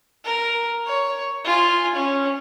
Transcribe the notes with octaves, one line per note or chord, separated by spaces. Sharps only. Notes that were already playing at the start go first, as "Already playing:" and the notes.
A#4
C#5
F4 G#5
C#4